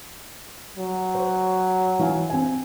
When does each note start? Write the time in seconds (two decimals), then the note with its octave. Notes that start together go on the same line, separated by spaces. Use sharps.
0.77 F#3
1.15 C5
1.99 E3 F5 G#5
2.30 C4 G#5